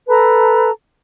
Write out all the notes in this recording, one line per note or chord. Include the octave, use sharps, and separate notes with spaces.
A4 B4 A5 A#5